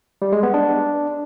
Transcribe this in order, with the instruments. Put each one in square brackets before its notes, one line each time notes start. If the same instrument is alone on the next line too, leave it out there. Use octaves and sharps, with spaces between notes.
[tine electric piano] G3
G#3
B3
D4